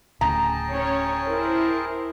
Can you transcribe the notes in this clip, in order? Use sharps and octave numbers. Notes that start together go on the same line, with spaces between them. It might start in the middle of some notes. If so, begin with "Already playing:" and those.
D1 D2 C#3 G#4 G5 A5 A#5
C#4 C#5
E4 A#4 C5